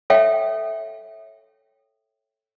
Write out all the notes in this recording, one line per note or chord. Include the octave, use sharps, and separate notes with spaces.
A4 C#5 E5 F5 G5